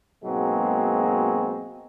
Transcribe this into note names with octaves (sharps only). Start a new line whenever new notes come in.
G#2 B2 F#3 G#3 A#3 C4